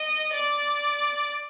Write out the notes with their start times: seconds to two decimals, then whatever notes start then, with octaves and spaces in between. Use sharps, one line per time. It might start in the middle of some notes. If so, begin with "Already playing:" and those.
Already playing: D#5
0.32 D5